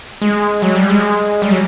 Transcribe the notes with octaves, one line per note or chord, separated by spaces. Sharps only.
G#3
F#3
G3
G#3
G3
F#3